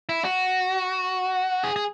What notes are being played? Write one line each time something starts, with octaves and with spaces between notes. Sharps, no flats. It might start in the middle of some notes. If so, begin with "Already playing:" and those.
E4
F#4
G#4
G#4